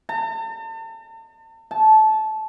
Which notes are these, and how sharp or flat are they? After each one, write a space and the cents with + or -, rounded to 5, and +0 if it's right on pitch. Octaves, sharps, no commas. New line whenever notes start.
A5 +40
A5 -20